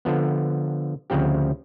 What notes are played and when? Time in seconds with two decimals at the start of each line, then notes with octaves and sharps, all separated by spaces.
0.05 D3 F3 B3
1.10 D2 C#3 F3 C4 G4